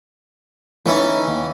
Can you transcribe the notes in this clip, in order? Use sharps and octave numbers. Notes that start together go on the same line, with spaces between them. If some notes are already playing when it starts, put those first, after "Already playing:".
E3 A3 C#4 D#4 E4
D#2